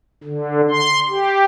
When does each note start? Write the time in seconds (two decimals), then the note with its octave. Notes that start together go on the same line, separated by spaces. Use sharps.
0.24 D3
0.70 C6
1.09 G4